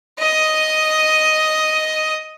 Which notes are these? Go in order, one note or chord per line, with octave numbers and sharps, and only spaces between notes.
D#5 D#6